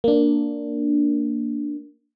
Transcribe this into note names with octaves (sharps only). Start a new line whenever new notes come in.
A#3 D4